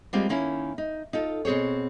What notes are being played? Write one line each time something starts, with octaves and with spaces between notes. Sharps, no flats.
G3 G#3 A#3 C4 F4
D#3 A#3 C#4 E4
D#4
D#4 F4 A4
B2 C4 G#4 C5 C#5